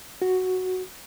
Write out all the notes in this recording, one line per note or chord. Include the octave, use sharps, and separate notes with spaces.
F#4